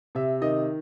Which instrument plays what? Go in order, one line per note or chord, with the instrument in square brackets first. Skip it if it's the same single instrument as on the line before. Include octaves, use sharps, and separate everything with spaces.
[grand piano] C3 E5
D#3 D#5